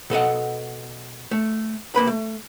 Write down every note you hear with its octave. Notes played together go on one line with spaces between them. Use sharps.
B2 A4 D#5 F#5
A3
C2 A#3 B4 B5
A3